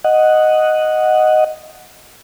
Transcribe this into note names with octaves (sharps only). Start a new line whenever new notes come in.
D#5 F#5